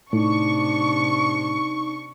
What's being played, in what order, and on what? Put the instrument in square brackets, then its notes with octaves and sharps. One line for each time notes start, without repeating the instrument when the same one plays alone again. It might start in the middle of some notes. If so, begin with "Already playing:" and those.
[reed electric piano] A2 [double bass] C3 D4 [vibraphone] D#4 [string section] C#6